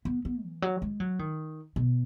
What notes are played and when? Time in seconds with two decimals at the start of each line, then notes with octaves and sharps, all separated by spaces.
0.05 B3
0.25 B3
0.44 E3
0.62 F#3
0.82 G#3
1.00 F#3
1.19 D#3
1.76 B2